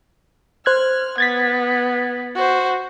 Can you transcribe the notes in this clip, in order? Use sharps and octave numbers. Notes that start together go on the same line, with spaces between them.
C5 F6 F#6 G#6
B3 G#6 A6 B6
F#4 C5